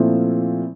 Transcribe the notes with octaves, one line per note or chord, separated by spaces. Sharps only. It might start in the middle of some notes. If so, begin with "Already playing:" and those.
Already playing: A#2 F3 A3 C4 E4